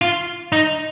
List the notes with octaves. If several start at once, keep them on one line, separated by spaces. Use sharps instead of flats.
F4
D#4